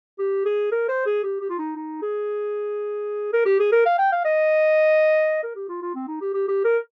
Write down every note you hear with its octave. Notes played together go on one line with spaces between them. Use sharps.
G4
G#4
A#4
C5
G#4
G4
G4
F4
D#4
D#4
G#4
A#4
G4
G#4
A#4
F5
G5
F5
D#5
A#4
G4
F4
F4
C4
D#4
G4
G4
G4
A#4